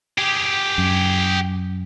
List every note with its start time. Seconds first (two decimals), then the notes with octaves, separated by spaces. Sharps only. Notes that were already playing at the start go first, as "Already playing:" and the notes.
0.18 G4 G#4
0.78 F#2